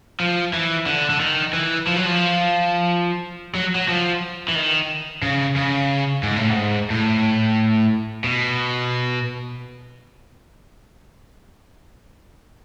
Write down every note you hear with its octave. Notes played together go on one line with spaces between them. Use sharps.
F3
E3
D3
D3
D#3
E3
F3
F#3
F3
F#3
F#3
F3
E3
D#3
C#3
C#3
G#2
A2
G#2
A2
B2